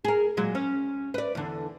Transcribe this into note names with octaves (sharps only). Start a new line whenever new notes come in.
G#4 A#4
A#2 F#3 G#3
C#4
B4 D5
E2 D3